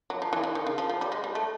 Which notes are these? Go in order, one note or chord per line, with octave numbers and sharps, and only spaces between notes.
F#3
F3
E3
E3
D#3
C#3
F3
F3
G3
G#3
G3
A3